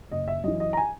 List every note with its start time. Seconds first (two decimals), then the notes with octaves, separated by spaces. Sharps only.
0.11 F#1 D#5
0.28 E5
0.44 F#2 E3 D#5
0.60 D#5
0.73 A#5
0.77 G#5